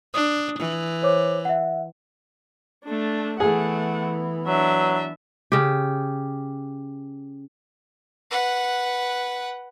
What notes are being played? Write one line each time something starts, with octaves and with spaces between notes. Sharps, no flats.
D4 D#6
E3
C5 C#5 D6
E5 F#5
A3 D4
E3 A3 B3 G#4 F#5
F#3 D4 E5
C#3 G4
B4 F#5